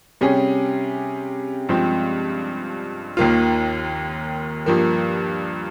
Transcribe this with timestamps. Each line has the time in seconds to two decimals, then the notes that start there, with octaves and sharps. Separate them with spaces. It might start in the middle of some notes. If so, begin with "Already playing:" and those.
0.21 C3 G3 C#4 G#4
1.69 G2 F3 G#3 C4
3.17 D#2 D#3 A#3 F4
4.66 G2 F3 A#3